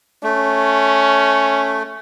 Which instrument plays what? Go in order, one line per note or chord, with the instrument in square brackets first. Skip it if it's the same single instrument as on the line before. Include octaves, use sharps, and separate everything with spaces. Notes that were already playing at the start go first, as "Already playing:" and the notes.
[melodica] A3 [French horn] C#4